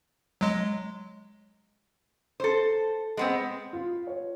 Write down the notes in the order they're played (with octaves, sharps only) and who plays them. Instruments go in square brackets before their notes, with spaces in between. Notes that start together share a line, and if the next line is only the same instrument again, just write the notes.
[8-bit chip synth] F#3 G#3
[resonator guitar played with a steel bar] A4 C5
G#3 B3 C4
[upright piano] F4
C#5